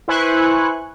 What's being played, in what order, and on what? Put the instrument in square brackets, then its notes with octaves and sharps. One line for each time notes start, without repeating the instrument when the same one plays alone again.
[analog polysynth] E4 B4 C5 G#5 C#6 F#6